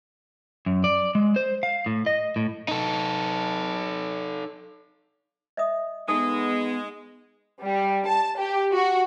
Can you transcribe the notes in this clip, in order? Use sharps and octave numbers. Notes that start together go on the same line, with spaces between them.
F#2
D5
G#3
C5
F5
A2
D#5
A2
D#4 A4
D#5 E5 D#6
G#3 B3 D#4 A4 D#6
G3
A5
G4
F#4